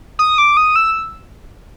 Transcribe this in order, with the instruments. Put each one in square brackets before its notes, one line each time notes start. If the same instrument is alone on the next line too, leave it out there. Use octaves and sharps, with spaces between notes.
[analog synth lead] D#6
D6
D#6
E6